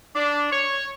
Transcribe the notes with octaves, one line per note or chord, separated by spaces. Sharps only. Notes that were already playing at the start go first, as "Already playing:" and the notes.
D4
C#5